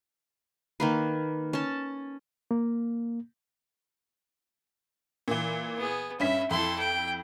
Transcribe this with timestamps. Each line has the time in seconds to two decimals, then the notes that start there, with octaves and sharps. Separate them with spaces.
0.80 D#3 A#3 B4
1.53 C#4 A5
2.51 A#3
5.28 A#2 E3
5.76 B3 G#4
6.20 G2 C#4 E5 B6
6.51 F2 E4 A4 C6
6.79 G5